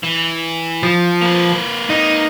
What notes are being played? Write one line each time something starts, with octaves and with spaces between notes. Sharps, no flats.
E3
F3
A#3 B4
D#4